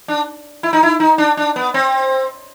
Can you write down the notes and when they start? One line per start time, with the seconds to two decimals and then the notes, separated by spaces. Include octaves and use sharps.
0.08 D4
0.63 E4
0.73 D#4
0.83 E4
1.00 D#4
1.18 D4
1.37 D4
1.56 B3
1.74 C4